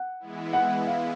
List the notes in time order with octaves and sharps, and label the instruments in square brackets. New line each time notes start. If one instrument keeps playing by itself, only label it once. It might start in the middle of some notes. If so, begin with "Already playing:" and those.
Already playing: [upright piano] F#5
[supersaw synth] E3 G#3 B3 E4
[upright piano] F#5
F5